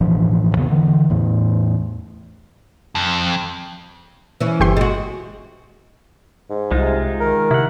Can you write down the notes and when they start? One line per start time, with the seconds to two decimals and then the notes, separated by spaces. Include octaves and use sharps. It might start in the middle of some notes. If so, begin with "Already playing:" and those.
0.01 E1 A1 F3 D4
0.56 E2 C#3 B3
0.70 D3 E3
1.10 E2 A2
2.95 F2
4.41 E3 C#4
4.60 G1 G4 C6
4.77 G#3 F#4
6.50 G#2
6.71 C2 C3 G#3 D#4 F4
7.20 D#3 A#4
7.51 C3 E4 F#5